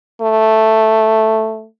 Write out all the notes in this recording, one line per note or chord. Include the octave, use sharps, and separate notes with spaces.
A3